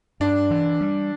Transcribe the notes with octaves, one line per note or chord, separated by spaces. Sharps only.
G2 D4
E3
G3